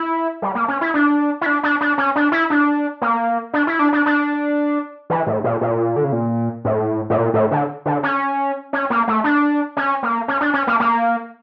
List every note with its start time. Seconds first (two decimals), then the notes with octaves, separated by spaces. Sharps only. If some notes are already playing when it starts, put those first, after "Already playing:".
Already playing: E4
0.42 G3
0.55 A#3
0.68 C#4
0.81 E4
0.94 D4
1.41 E4
1.46 D4
1.63 D4
1.81 D4
1.98 C#4
2.16 D4
2.32 E4
2.50 D4
3.02 A#3
3.53 D4
3.67 E4
3.79 D4
3.93 D4
4.06 D4
5.10 E3
5.27 A2
5.44 A#2
5.61 A#2
5.96 D3
6.04 C#3
6.12 A#2
6.65 A2
7.10 A2
7.17 A#2
7.34 A2
7.51 D3
7.86 D3
8.03 C#4
8.73 C#4
8.90 A#3
9.08 A3
9.24 D4
9.77 C#4
10.03 A#3
10.28 C#4
10.41 D4
10.53 C#4
10.67 A#3
10.80 A#3